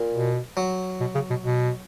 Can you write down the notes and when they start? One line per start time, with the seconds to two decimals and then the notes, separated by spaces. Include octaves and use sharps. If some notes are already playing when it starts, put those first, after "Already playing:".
Already playing: A#2
0.14 B2
0.57 F#3
1.01 B2
1.15 C#3
1.30 B2
1.45 B2